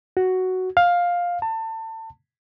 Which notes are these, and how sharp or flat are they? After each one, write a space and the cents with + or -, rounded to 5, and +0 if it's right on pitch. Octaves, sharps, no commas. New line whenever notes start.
F#4 +5
F5 +10
A5 +30